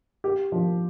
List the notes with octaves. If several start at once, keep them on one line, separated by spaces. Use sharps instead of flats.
G4
F3